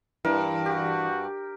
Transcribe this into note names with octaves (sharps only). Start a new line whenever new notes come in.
G2 E3 A#4
F#4 G4